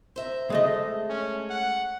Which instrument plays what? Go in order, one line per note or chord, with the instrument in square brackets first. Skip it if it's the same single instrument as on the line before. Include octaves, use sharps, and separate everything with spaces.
[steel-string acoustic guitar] C5 E5 A#5
[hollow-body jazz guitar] G#3 A3 D#5
[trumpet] C#4
F#5